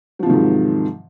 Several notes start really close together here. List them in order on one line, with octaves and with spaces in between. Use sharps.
F#3 F3 C3 D#3 G#2